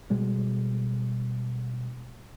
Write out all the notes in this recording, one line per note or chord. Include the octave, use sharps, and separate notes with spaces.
B2 G3 G#3